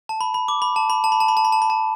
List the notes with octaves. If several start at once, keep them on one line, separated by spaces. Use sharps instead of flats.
A5
B5
B5
D6
B5
A5
B5
A5
B5
A5
B5
A5
B5
A5
B5
A5